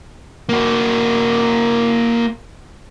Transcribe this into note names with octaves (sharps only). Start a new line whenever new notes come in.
A#3 F#4